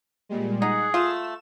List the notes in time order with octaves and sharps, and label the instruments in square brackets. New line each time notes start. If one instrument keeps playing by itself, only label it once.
[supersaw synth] A#2 G3 G#3
[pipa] D#4 [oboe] G#4 [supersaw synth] F#5
[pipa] A3 F4 [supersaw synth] E7